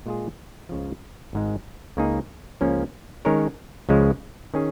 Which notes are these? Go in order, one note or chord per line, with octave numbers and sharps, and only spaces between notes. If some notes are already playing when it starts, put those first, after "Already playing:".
A#2 G#3 F4 G#4
C#2 C#3 F3
G#1 G#2 G#3
C#2 C#3 A#3 D#4 G#4
C#2 C#3 F3 A#3 C#4
D#3 G#3 C#4 A#4 C#5
C#2 C#3 F3 G#3
D#3 C#4 G#4